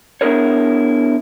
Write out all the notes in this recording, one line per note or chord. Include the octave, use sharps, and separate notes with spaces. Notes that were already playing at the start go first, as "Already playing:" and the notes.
B3 D4 E4 G#4 A#4 C#5